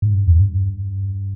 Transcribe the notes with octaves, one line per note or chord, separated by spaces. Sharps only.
G#2
G2
E2
G2